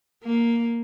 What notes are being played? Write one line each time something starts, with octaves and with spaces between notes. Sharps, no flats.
A#3